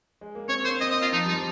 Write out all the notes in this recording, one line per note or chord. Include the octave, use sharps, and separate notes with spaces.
G#3
A#3
C4 C#5
A#3 C5
C4 D#5
D#5
F4
F3 D#4
G3 D#4
F3